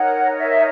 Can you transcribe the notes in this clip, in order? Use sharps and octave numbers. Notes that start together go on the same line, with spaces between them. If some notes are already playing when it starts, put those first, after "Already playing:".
Already playing: D#4 A#4 C#5 F#5
E5